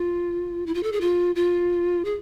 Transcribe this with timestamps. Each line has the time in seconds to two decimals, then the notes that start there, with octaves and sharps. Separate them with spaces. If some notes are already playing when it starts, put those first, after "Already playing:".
Already playing: F4
0.66 E4
0.74 F4
0.83 A4
0.92 G#4
1.01 F4
1.35 F4
2.05 G#4